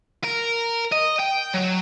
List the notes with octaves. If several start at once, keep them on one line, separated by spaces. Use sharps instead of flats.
A#4
D#5
G5
F#3